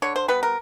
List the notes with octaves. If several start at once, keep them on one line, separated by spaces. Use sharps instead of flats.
D3 C#5
C5
G3 B3 B4
A#4